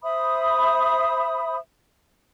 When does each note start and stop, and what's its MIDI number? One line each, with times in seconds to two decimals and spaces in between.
0.03 1.57 72
0.03 1.57 76
0.03 1.57 83
0.03 1.57 87